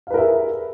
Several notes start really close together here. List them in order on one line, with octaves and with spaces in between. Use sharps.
F5 B4 A#4 E5 G#4